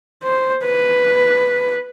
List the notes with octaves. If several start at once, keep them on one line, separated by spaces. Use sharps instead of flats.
C5
B4